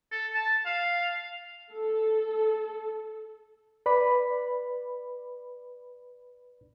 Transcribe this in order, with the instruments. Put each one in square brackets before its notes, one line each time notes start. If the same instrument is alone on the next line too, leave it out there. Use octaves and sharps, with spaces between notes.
[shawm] A4
A5
F5
[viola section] A4
[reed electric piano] B4 D5 B5